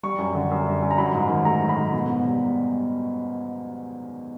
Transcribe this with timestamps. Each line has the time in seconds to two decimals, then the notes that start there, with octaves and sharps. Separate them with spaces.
0.03 G3 C#6
0.18 F#2
0.35 D3
0.51 F#2
0.67 G3
0.82 F#2
0.91 A#5
0.98 F#3 B5
1.14 G#2
1.29 D#3
1.45 A3 A#5
1.62 F#3
1.69 B5
1.77 G#2
1.93 B2
2.10 B2
2.25 G3